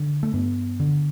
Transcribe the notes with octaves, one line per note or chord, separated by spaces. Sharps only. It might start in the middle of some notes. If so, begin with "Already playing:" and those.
Already playing: D3
A3
G2 B3
D3